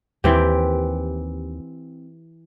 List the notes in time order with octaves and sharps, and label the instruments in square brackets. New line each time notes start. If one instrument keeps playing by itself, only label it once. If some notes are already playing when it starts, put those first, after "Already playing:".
[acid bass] D#2 [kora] E3 C4 G4